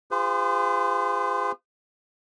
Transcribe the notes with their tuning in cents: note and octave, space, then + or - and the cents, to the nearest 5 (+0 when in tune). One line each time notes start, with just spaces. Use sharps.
F4 +0 G#4 -35 C5 -45